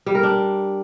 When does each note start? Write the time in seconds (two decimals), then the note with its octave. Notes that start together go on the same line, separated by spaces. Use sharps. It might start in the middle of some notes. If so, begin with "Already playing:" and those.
0.06 G3
0.15 A#4
0.23 D4